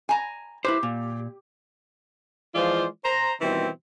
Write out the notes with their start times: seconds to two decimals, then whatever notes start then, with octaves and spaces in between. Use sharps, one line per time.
0.09 G#5 A#5
0.65 E4 G4 B4 C5
0.83 A#2
2.55 E3 F3 G#3 F4 C5 D5
3.05 C5 A#5
3.41 B2 D#3 E3 G3 C4